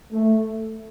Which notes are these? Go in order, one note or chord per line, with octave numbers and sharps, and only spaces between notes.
A3